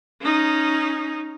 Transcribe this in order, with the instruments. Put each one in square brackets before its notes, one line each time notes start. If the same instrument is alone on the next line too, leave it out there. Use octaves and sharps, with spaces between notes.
[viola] C#4 D#4